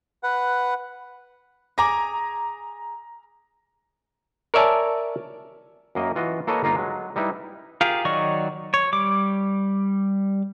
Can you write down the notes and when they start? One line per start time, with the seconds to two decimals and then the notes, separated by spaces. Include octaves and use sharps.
0.23 B4 F#5
1.78 G#4 G#5 A#5 D6 A#6
4.54 A#4 C#5 D5 E5 G#5 A5
5.95 F#2 A#3 D#5
6.16 E3 F4 F#4 D#5
6.47 A#3 A4 B4 C#5 D#5 G#5
6.63 G1 A#3 D#4 F4 A#5
6.76 F#3 G#3
7.16 G3 D#4 E4 B4
7.81 F4 G4 G#4 A#4 F5
8.05 D#3 F#3 D5 D#5 C#6
8.74 C#5
8.93 G3 D6